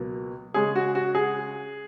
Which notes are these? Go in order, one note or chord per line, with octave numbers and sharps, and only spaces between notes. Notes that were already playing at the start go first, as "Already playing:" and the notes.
Already playing: C#2 B2 F#3 A#3
C#3 G#3 C#4 G#4
F#4
F#4
G#4